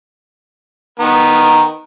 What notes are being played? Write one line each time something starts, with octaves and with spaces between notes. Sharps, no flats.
D#3 B3 A#5